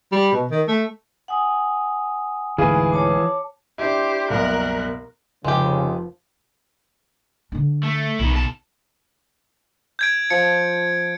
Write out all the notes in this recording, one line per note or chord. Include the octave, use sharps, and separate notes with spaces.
G3
B2
D#3
A3
F#5 G#5 D#6
E1 D2 G#2 E3 G#4 F5
C#5 A5 D6
D4 E4 G4 C5
F#1 C2 B2 A#4 F#6
F1 C#3 F3 G#3 G4
D3 D4
A3
B1 D#3 E4
C#3 A5
G6 G#6 D7
F3 C#7